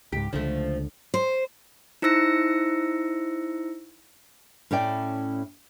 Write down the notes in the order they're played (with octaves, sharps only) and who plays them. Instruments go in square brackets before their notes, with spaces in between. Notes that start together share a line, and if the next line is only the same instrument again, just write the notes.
[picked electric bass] C#2 G#2 [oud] G4
[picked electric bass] C#2 D3 [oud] F3 A3
[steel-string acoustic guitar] C5
[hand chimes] D#4 E4 C5 E6 A#6 C#7
[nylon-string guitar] A2 C#4 E4 D5 G5